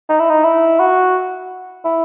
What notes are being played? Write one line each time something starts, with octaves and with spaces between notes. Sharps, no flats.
D#4
E4
D#4
E4
F#4
E4